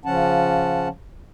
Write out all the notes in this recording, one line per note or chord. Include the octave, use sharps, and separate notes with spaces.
C#3 F3 C#4 F#5 A5